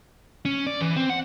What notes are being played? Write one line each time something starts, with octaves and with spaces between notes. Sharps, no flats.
C#4
D5
E3
C4
F#5